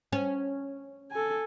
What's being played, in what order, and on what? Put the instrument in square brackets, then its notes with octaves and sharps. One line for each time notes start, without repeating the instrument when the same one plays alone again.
[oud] C#4
[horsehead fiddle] A4 G#5